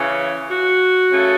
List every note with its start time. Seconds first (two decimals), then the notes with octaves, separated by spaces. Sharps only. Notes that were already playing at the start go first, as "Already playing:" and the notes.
Already playing: C#3 E3 C#4
0.49 F#4
1.11 C#3 A3 C#4